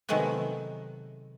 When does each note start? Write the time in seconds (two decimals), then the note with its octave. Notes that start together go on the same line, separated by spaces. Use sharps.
0.09 C3 D#3 F#3 G#3 A3 B3